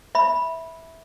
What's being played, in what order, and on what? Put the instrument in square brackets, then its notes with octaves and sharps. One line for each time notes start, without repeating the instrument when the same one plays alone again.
[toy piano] E5 B5